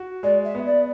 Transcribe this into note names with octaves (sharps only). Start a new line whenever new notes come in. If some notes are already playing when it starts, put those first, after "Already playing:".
Already playing: F#4
G#3 D5
E5
B3
D5